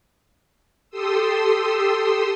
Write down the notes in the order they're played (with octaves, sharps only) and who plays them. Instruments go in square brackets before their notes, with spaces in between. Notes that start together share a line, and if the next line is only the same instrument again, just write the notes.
[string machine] G4 A4 C6 D#6 E6